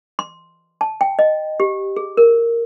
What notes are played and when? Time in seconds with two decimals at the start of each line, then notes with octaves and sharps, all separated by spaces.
0.19 C6
0.81 A5
1.01 G5
1.19 D#5
1.60 G4
1.97 G#4
2.17 A#4